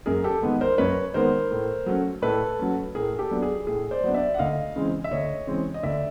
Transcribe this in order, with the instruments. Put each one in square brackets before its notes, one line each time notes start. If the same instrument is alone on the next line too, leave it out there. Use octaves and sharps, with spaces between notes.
[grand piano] F#2 G#4 A#4
G4 A4
D#3 G#3 B3
A#4 C5
F#2 B4 C#5
D#3 G#3 B3 A#4 C5
A2
F#3 A3 C#4
A2 A4 B4
F#3 A3 C#4
A2 G#4 A#4
G4 A4
F#3 B3 D4
G#4
A2 G#4
C5 D5
F#3 B3 D4
D5 E5
F#5
D2 D#5 F5
C#3 E3 G#3 C4
E5
D2 C#5 D#5
C#3 E3 G#3 C4
D#5
D2 D5 E5